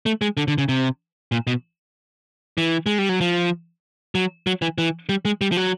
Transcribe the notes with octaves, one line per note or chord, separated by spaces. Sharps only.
A3
G#3
D3
D3
C#3
C3
A#2
B2
E3
G#3
G3
F#3
F3
F#3
F#3
E3
E3
G3
G#3
G3
F3
F#3